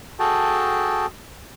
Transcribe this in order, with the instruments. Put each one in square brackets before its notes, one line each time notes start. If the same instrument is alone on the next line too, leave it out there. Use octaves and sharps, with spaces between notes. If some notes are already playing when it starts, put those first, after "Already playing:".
[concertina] F#4 G#4 A4 G5 A5